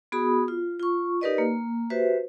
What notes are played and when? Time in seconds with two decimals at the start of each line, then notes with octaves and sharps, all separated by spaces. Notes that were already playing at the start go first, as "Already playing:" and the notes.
0.12 B3 F#4 G#4 B5 D#6
0.48 F4
0.79 F4 C#6
1.21 D#4 G4 A#4 B4 D5 D#5
1.38 A#3
1.90 F#4 G4 B4 C5 E5